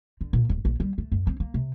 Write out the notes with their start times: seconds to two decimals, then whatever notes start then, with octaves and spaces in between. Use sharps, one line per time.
0.21 D3
0.33 A#2
0.49 D1
0.65 A#1
0.80 G3
0.98 A3
1.12 F#2
1.27 C4
1.40 A#3
1.54 C3